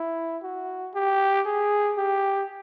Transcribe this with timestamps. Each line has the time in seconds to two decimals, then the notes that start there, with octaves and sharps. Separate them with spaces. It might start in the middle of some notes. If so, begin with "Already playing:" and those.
Already playing: E4
0.43 F#4
0.94 G4
1.46 G#4
1.98 G4